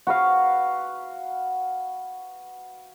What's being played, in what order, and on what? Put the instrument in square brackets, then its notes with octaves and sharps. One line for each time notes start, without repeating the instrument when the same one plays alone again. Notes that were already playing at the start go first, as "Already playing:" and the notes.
[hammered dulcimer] F#4 B4 F5